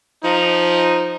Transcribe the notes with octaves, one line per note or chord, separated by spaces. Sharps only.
F3 D#4